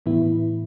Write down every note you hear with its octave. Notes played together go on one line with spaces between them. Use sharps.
A2 E3 B3 E4